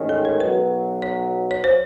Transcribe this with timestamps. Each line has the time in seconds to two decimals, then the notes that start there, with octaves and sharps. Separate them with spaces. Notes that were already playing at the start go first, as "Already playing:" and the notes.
Already playing: A1 G#2 D#3 G#3 C#4
0.09 A4
0.25 A#4
0.40 B1 B2 F#3 B4
1.02 C#5
1.51 C#5
1.64 C5